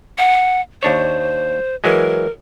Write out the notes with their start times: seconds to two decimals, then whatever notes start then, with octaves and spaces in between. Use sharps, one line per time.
0.18 F#5
0.83 D#2 D4 C5 C#5
1.84 E3 F#3 G#3 A#4